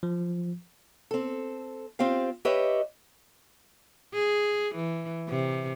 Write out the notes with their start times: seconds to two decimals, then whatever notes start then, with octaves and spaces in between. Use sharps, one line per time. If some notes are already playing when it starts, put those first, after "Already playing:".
0.03 F3
1.11 C4 A4
1.99 C4 F4 G4 F5
2.45 G4 B4 C#5 D#5 E5
4.14 G#4
4.75 E3
5.28 C3